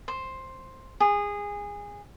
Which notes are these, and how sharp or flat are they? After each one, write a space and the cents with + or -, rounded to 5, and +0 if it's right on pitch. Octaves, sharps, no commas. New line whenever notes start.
C5 +5
G#4 -20